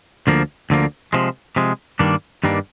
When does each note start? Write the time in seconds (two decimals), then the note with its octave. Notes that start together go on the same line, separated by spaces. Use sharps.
0.27 D2 D3 F3 A#3
0.70 D2 D3 F3 A#3
1.13 C3 F3 G#3
1.56 C3 F3 G#3
1.99 G2 D#3 G3 A#3 D4
2.44 G2 D#3 G3 A#3 D4